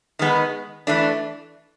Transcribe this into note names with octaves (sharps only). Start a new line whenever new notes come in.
D#3 G#3 B3
E3 A3 D4